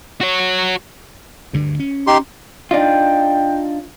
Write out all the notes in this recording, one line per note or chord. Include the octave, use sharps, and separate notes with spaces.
F#4 C#5
D2 G2 D3
C#4
D#4 G4 C6
D4 D#4 F4 G5